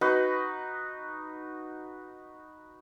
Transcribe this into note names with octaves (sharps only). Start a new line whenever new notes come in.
D#4 F#4 B4